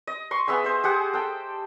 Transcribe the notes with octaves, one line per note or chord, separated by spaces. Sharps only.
D#5
C6 C#6
B3 G#4 E5 G#5
C5 D#5
G4 G#4 F#5
A4 G5